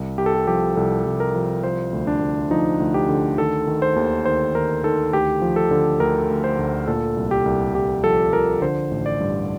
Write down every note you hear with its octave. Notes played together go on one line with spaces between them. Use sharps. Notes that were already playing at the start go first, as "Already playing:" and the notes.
Already playing: C2
C2 G4
A4
G4
F3 G4
C2 A4
C2
A#4
F3
F3 C5
D2
D4
D2
F3 D#4
D2
G4
D3
D#3 A4
D#3
C5
D#2
D#3 C5
D#3 A#4
D#3 A4
D2 G4
F3
A4
D3
D2 A#4
D2
C5
D2
A#2 A4
C2
G4
C2
C2 G4
F3 A4
F3 A#4
D3 C5
A1
D5
G2